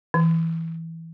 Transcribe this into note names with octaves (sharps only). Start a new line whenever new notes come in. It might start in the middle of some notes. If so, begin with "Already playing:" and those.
E3